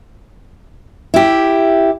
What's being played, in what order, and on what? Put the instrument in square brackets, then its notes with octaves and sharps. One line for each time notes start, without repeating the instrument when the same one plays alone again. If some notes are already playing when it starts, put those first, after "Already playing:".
[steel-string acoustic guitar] E4 G4